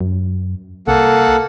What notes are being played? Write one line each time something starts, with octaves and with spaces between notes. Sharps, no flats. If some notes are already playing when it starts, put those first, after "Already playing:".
F#2
C2 A#3 A4 F#5